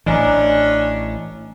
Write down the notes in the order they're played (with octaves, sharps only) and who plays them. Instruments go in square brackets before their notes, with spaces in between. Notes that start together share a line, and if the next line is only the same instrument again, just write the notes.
[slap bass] A1 E3 [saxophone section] C#4 D4 [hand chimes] D#5 G#5 A#5